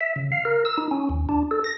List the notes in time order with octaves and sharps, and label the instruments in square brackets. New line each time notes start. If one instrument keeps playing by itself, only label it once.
[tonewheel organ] E5
C#3
F5
A#4
E6
D#4
C#4
D#2
D4
A4
A#6